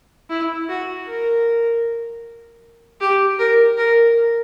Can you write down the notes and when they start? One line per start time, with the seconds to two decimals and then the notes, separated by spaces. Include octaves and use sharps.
0.30 E4
0.69 F#4
1.08 A#4
3.01 G4
3.39 A#4
3.78 A#4